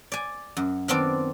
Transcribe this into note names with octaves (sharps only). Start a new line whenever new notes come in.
D5 G#5
F#2
D#3 B3 C4 D4 D5